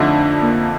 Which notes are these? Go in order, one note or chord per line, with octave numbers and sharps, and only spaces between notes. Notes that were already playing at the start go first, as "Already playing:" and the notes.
Already playing: F2 D3 A3 D4 D#4
A#3